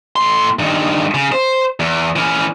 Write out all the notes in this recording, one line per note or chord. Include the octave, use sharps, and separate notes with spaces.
A2 C6
G2 D#3
C#3
C5
E2
E3 C#4